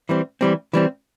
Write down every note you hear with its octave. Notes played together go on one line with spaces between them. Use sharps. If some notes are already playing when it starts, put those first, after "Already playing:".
E3 G3 C4
E3 G3 C4
E3 G3 C4